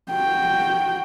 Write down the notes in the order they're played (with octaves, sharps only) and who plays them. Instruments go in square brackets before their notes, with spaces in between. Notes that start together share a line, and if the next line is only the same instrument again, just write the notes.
[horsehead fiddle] F#4 G5